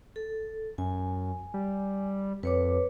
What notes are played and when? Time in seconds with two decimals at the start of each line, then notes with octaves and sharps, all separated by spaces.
0.16 A4
0.78 F#2 G#5
1.54 G3
2.43 F2 B4 C#5 D6